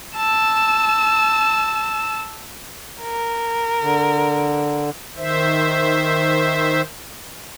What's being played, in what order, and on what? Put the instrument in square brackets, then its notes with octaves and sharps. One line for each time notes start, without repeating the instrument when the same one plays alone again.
[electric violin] A5 E6
[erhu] A#4
[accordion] D3
[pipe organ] D#3 C5 E5